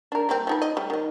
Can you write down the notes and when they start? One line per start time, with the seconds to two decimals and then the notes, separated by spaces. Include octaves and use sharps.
0.12 D4 A#4
0.29 G3 A#3 C4
0.47 F3 D#4 B4
0.62 D#5
0.77 G3 A3
0.90 D#3 D#5